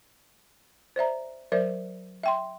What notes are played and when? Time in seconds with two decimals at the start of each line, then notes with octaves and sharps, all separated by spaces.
0.96 C5 D5 E5 A#5
1.52 F#3 A#4 C5 D5 E5
2.23 E5 G5 C6